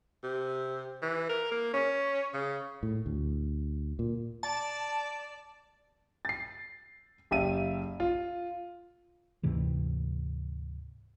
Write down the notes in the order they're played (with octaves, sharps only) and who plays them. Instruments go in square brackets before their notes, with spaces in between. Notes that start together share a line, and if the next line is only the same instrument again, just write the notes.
[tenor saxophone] C3
E3
A#4
A#3
C#4
C#3
[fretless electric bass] A2
D2
A#2
[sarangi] D5 [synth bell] A5
[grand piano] A6 C7
F#1 G4 E5 F5 D#7
F4
[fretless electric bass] D2 G#2 C3 E3